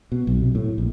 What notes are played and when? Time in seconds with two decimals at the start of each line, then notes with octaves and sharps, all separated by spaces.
0.12 B2
0.27 B1
0.41 C3
0.55 A2
0.78 A#1